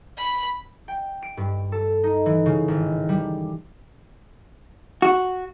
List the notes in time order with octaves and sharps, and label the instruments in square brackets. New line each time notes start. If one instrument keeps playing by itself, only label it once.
[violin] B5
[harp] G5
D7
G2
A4
D#4
E3
C#3
G#1
G3
[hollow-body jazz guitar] F#4